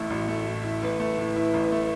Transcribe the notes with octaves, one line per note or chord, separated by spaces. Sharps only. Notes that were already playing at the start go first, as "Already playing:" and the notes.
Already playing: A1 A2 A3 E4
A1 F#4
A3
A2
E4
A1 B4
A3
A2
E4
A1
A3